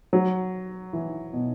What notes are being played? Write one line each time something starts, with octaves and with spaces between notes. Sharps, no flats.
F#3
E3
B2